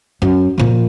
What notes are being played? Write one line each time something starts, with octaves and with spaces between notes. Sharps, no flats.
F#2
A#2 F3